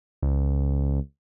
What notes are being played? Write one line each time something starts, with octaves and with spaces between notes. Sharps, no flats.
C#2